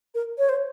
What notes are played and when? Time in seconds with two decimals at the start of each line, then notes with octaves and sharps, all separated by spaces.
0.14 A#4
0.38 C#5
0.49 C5